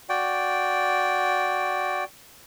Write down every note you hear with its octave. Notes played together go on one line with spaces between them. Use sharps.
F#4 D5 G5